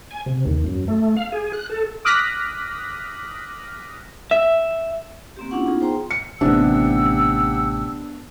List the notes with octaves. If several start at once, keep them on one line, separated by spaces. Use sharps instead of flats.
G#5
C3
D#2
F#2
A3
F5
G#4
F#6
A4
D6 D#6 F6 F#6 A#6 B6
E5
A#3 C4 G4
C#4 D4 E4 F4 F#5 C#6
B3 D#4 F4 G#4
C5 G5 A#5 C6
C#7
A1 C3 B3 D4 G4 F#5 E6